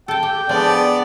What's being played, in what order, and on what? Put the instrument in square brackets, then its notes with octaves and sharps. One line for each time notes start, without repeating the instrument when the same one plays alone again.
[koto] A4 A5 [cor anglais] G5
[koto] G4
[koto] F3 G#3 D4 [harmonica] B3 D5